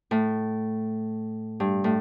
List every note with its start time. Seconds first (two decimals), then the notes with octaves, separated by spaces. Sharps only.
0.11 A2
1.60 G2
1.84 A2